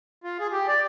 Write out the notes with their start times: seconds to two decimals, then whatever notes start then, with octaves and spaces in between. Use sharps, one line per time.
0.24 F4
0.40 G#4
0.52 G4
0.68 D5